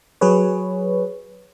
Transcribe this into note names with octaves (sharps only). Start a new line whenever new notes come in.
F#3 G#4 B4 C#5